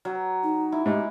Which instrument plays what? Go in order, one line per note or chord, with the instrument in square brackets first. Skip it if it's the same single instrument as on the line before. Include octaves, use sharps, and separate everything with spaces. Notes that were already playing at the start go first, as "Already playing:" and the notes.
[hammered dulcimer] F#3
[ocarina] D#4
[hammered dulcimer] E4
[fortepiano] G#2 [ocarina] G4